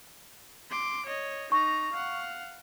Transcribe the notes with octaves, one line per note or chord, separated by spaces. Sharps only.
C6 D6
C#5 D#5
D#4 A#5 C#6
F5 F#5